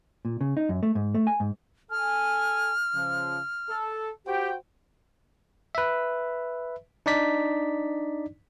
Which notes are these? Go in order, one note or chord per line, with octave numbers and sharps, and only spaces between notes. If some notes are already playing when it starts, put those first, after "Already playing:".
A#2
C#3
D#4
F#2
A3
G#2
A3
G#5
G#2
A4 G#5 F6
C#3 F3
A4
F#4 G4 C5 G5
B4 E5
D4 D#4 D5 B6